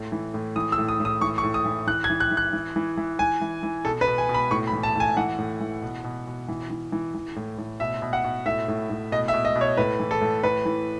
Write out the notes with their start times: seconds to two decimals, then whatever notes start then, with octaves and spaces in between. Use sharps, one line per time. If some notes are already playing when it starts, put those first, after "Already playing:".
Already playing: A2
0.12 E3
0.34 A2
0.56 E3 D#6
0.72 E6
0.78 A2
0.88 D#6
1.00 A2
1.05 D#6
1.21 E3 C#6
1.38 C#6
1.43 A2
1.54 D#6
1.66 E3
1.87 E3 F#6
2.04 G#6
2.10 E3
2.20 F#6
2.31 E3
2.37 F#6
2.53 E3
2.76 E3
2.97 E3
3.19 E3 G#5
3.41 E3
3.63 E3
3.85 B2 A4
4.01 B4
4.07 B2
4.18 G#5
4.29 B2
4.34 B5
4.51 A2 C#6
4.67 B5
4.73 E3
4.83 A5
4.95 A2
5.00 G#5
5.17 E3 F#5
5.38 A2
5.60 E3
5.82 B2
6.04 B2
6.27 B2
6.48 E3
6.70 E3
6.92 E3
7.14 E3
7.36 A2
7.58 A2
7.80 B2 E5
8.02 B2
8.13 F#5
8.24 B2
8.46 A2 E5
8.68 A2
8.90 A2
9.12 B2 D#5
9.28 E5
9.34 B2
9.45 D#5
9.55 B2
9.61 C#5
9.77 A2 B4
9.99 E3
10.11 A4
10.21 A2
10.43 A2 B4
10.65 E3